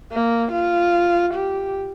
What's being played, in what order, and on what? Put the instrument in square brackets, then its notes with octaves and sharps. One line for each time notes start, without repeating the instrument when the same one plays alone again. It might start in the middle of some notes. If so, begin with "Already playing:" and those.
[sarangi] A#3
F4
G4